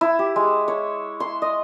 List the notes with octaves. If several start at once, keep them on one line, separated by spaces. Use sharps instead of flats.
E4
G4
G#3
C#5
C6
D#5